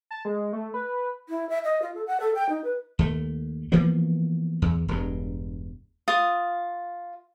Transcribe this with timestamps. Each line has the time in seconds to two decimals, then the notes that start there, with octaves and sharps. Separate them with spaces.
0.11 A5
0.25 G#3
0.53 A3
0.74 B4
1.29 E4
1.50 E5
1.64 D#5
1.82 F4
1.95 A4
2.07 F#5
2.20 A4
2.35 G5
2.49 D#4
2.64 B4
2.99 D#2 A3
3.72 E3 F3 A#3 B3
4.62 E2
4.88 E1 G2
6.08 F4 D#6